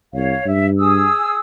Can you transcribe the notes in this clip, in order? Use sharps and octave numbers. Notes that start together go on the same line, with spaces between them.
C2 C#5 F5
G2 E5
G#4 D#6 E6